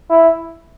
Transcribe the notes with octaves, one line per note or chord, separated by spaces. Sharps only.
E4